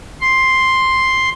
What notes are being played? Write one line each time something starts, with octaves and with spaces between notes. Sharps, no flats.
C6